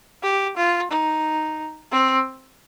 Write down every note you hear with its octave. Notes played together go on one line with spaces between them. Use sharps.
G4
F4
D#4
C4